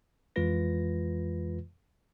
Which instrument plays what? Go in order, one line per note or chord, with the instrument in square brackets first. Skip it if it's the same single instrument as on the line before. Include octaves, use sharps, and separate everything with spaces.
[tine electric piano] F2 E3 G#3 F4 B4 A#6